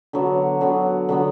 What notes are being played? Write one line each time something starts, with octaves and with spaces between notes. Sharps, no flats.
D3 F#3 B3
D3 F#3 B3
D3 F#3 B3